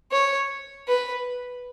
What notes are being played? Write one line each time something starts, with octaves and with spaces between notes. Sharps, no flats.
C#5
B4